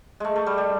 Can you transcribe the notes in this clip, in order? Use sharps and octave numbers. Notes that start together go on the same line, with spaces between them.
G#3 A3
A3
G3
G3